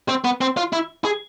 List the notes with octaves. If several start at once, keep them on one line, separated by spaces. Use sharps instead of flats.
C4
B3
C4
F4
E4
G#4